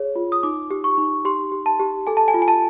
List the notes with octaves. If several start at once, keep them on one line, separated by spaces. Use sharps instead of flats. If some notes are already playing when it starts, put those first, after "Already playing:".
Already playing: G#4 C#5
F4
D#6
D#4 D6
G4
C#6
D#4
G4 C6
G4
A5
G4
A4 G#5
A5
G#5
F4
G#5
A5